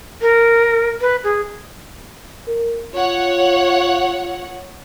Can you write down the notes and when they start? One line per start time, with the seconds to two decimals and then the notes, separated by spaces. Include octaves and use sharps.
0.21 A#4
1.01 B4
1.24 G#4
2.47 A#4
2.95 F4 C#5 F#5